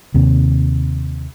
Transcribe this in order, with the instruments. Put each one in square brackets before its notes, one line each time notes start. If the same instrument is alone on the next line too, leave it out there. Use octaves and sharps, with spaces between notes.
[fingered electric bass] D#2 C3